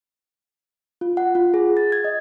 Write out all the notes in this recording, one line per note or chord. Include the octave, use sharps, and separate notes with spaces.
F4
F#5
F4
G#4
A6
G#6
D#5